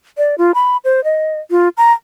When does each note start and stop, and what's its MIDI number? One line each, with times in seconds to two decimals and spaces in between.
0.18 0.35 74
0.38 0.52 65
0.55 0.77 83
0.85 1.04 72
1.04 1.40 75
1.51 1.69 65
1.77 1.92 82